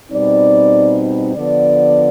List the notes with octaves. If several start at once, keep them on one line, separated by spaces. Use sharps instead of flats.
B2 G3 C4 D#4 D5
D3 F3 B3 D5